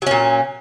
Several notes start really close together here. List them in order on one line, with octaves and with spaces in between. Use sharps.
F#3 C#4 A#2